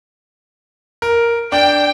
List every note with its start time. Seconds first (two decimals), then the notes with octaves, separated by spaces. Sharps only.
1.02 A#4
1.52 D4 G5